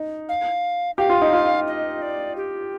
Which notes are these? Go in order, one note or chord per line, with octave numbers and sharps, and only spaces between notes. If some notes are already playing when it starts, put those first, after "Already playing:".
Already playing: D#4
F5
G4 F5
F4
D#4
F4
D#5
D5
G4